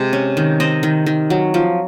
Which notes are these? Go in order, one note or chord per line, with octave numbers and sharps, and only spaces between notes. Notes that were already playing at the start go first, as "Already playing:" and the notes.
Already playing: C3 G#3
C#4
D#3
C4 D#5
D#3
D#3
F#3
F3